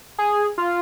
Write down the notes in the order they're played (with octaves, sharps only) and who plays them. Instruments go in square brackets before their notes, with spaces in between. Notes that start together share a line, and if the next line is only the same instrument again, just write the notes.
[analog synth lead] G#4
F4